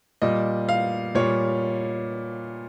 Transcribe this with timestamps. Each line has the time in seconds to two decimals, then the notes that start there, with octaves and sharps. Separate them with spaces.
0.22 A#2 G3 D#5
0.69 F5
1.15 A#2 G3 C#5